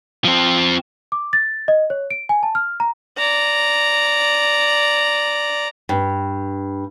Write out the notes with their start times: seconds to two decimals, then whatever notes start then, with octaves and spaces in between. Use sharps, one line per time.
0.25 F3 C4
1.12 D6
1.33 A6
1.68 D#5
1.90 C#5
2.11 D7
2.29 G#5
2.43 A5
2.55 F6
2.80 A#5
3.17 D5 A#5
5.89 G2